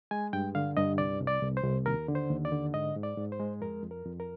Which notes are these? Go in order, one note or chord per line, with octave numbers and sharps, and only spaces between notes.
G#3 G#5
G2 G5
D3 F5
G2 D#5
C2 D5
C2
D5
C2
C5
C2
D#2 A#4
D3
C5
D#2
D5
D3
G#2 D#5
G#2
D5
G#2
C5
G#3
F2 A#4
F2
A#4
F2
A#4